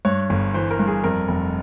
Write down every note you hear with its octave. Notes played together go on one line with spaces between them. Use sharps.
G2 C#5
G1
E3 C5
A#4
G2
G#4
F2 A#4
F1